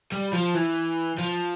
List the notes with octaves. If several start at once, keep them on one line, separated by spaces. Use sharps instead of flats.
G3
F3
E3
F3